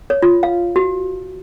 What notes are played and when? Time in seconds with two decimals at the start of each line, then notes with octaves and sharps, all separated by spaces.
0.10 C#5
0.22 F4
0.43 F5
0.76 F#4